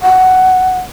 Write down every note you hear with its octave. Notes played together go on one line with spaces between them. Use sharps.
F#5